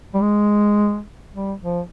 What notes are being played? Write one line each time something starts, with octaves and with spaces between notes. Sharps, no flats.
G3
G#3
G3
F3